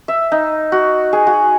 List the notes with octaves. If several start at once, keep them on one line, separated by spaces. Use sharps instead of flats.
E5
D#4
F#4
G#4
F#4